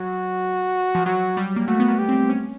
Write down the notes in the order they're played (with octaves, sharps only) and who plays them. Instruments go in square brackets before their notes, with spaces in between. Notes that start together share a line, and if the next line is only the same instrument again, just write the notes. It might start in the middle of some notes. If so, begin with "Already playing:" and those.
Already playing: [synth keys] F#3 [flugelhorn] F#4
[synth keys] F3
[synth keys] F#3 [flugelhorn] F#4
[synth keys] G3
A#3
[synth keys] A3 [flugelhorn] F#4
[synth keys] B3
A#3
[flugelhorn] G4
[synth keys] C4
C#4